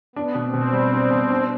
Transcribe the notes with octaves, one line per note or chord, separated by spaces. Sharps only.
B3 D4
B2
C4
B2
G3
D4
B2
D4